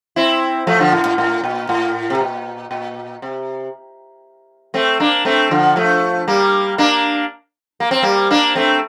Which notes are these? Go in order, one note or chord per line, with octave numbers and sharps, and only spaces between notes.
C4 E4
F3 A3
D3 F3
A2
A2
A2
A#2
A2
C3
A#2
A#2
C3
A3 C4
A#3 D4
A3 C4
D3 F3
F3 A3
G3 A#3
A#3 D4
A#3
C4
G3 A#3
A#3 D4
A3 C4